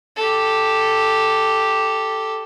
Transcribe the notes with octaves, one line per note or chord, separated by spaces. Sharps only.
G4 A4